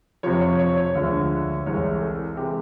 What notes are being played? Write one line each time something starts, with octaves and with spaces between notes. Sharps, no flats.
F2 C3 F3 C#5
C#5
C#5
C#5
D2 D3 F3 G#3
C2 C3 E3 G#3 C#5
A4
C3 E3 G#3 G4